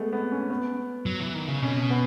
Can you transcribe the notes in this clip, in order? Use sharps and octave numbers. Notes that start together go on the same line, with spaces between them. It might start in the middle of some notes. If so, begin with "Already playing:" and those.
Already playing: G#3 A3 B3
B3
C#4
B3
F#3
E3
D#3
C#3
B2 C#4
B3